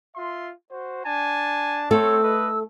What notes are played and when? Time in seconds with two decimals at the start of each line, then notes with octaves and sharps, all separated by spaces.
0.16 F4 E5 C6
0.71 F#4 C5
1.05 D4 G#5 A5
1.91 A3 C4 A4 C5 C#5 E6
2.22 B4 D#5